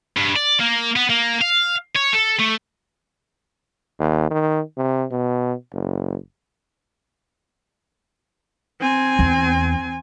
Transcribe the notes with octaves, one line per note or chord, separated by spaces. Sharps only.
G2
D5
A#3
B3
A#3
F5
C#5
A4
A3
D#2
D#3
C3
B2
F#1
C4 G#5
E2